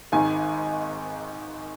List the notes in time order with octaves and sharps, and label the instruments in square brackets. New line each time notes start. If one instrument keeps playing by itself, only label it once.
[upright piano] G#1 G#2 D#3 G#5